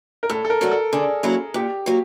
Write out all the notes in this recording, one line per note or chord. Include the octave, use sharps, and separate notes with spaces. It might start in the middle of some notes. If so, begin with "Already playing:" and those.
A#4
A2 A4
A4
A#4
F#3 A3 D4 F#4
A4
D3 G#4
F#3 A#3 C#4 E4
A#2 G4
F#3 A#3